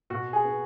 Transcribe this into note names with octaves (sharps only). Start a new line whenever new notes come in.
B2 F#4
G#4
B3